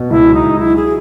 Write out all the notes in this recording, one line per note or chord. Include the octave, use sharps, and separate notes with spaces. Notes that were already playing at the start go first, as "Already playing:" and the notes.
Already playing: B2
C#2 E4
F#3
D#4
C#2
F#3 E4
G#4